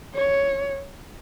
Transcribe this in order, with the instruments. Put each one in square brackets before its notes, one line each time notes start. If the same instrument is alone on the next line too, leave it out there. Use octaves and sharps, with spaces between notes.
[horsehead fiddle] C#5